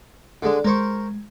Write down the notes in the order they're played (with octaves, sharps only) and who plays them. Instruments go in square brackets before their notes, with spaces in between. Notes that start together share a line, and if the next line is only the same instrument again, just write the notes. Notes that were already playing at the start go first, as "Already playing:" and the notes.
[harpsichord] D3 G#3 [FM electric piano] A4 D5
[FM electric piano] G#3 [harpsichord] A#4 C5 C#6